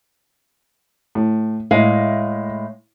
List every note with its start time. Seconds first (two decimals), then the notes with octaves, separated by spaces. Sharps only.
1.15 A2
1.71 A2 G#3 E4 F5